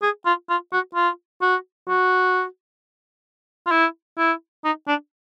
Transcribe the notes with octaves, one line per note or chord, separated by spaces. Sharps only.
G#4
F4
F4
F#4
F4
F#4
F#4
F4
E4
E4
D#4
D4